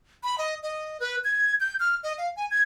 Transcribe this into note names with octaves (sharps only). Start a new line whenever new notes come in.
B5
D#5
D#5
B4
G#6
G6
F6
D#5
F5
G#5
G#6